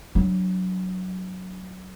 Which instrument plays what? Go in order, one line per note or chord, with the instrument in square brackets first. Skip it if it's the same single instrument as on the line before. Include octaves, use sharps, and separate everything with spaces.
[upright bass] F#3 D4